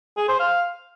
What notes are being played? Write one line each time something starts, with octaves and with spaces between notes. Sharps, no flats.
G#4
C5
F5